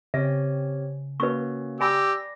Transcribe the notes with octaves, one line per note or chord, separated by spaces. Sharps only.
C#3 C4 G4 C#5 E5
A#3 C#4 F#4 B4 C#6
G4 D5 G#5 B5 D6 E6 A#6